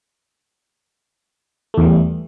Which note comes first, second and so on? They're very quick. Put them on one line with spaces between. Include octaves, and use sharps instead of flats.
A3 E2 E3 G3